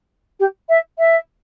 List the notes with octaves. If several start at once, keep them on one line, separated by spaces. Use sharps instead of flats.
G4
E5
E5